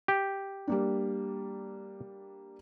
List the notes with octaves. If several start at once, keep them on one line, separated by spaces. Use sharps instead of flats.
G4
G3 A#3 D4